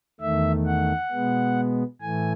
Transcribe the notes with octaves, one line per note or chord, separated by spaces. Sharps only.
E2 D#3 A3 E5
F#5
B2 G#3 B3
A2 E3 A3 G#5